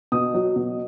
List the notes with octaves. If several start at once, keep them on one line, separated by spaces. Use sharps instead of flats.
B2 D#6
F#3
B2